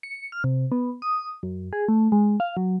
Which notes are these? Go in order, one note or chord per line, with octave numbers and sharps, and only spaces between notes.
C#7
F6
C3
B3
D#6
F#2
G#4
A3
G#3
F5
F#3